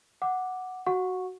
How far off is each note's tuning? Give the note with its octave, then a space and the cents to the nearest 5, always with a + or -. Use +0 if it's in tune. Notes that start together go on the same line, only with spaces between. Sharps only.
F#5 +0 D6 +0
F#4 +5 F#5 -25 C#6 -5